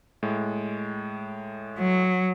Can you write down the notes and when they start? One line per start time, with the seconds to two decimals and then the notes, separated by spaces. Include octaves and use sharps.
0.23 A2 G#3
1.80 F#3